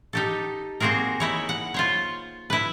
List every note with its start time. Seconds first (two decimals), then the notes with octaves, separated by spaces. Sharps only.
0.13 D#4 G4 A4
0.80 A#3 C4 F#4 G#4 A#4
1.20 D#4 E4 C#5
1.49 F#5
1.74 F4 C5 C#5
2.50 E4 B4